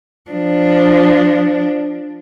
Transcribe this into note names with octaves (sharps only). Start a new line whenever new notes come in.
F3 D4